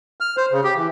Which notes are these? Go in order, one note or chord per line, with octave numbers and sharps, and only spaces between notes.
F6
C5
C#3
G4
E3